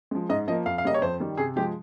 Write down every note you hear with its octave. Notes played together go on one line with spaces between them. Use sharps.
F3 G#3
G#2 D#5
F3 A#3 D#5
F2 F5
F5
C#3 G3 A#3 D#5
C#5
F2 C5
D#3 G3
C3 G#4
F3 G#3 G4